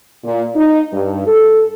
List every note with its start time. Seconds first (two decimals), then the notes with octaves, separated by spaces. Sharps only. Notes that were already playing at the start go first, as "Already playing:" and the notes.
0.24 A#2
0.56 D#4
0.92 G2
1.27 A4